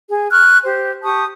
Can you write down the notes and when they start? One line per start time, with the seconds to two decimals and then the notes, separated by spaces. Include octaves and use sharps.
0.09 G#4
0.31 C#6 F6 F#6
0.63 G4 C5
1.03 G4 A5 C#6 D#6